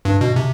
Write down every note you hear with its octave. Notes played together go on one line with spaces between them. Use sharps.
G2
B2
C3